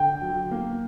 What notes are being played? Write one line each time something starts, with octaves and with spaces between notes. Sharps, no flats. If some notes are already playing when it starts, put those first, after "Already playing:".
Already playing: D3 G5
F#3
A#3